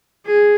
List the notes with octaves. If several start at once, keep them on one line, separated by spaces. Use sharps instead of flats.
G#4